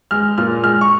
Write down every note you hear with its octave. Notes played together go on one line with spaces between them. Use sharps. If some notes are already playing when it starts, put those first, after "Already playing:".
G#3 F6
A#2 F6
G#3 F6
C#6